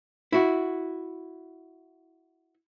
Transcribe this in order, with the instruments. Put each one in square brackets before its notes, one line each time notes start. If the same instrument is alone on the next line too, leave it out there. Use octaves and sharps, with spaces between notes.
[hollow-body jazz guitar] E4 F#4